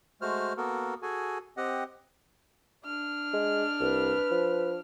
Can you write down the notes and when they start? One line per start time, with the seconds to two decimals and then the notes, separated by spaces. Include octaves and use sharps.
0.22 G#3 A3 F#4 C5 F6
0.57 A#3 B3 F#4 A4 A#4
1.02 F#4 G#4 A4 G#5
1.57 C4 G4 D#5 F#5
2.85 D4 F6
3.33 G#3
3.80 C2 B4
4.31 F3